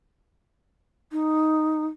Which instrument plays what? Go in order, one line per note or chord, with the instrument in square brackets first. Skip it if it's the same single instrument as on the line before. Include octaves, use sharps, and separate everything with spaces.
[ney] D#4